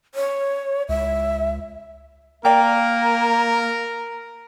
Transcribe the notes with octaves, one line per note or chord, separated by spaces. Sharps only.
C#5
C#2 E5
A#3 A#4 D5 G5